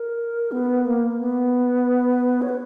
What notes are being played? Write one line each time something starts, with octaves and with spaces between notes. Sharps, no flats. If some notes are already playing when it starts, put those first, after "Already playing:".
Already playing: A#4
B3
A#3
B3
C#5
B4